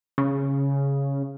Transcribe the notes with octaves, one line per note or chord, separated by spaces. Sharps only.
C#3